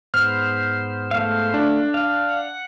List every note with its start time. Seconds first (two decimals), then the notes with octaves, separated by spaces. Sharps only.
0.14 G#2 B3 C5 F6
1.11 A3 F5
1.54 D4
1.94 F5
2.29 F#5